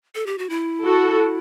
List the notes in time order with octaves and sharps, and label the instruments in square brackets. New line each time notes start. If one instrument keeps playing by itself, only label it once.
[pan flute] A4
G4
F#4
E4
[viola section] F#4 A4